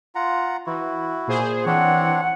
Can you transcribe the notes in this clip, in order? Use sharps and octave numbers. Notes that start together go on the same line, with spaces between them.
F4 F#5 A#5
E3 E4 F#4
A#2 G#4 C5
E3 C4 D4 C#5 F#5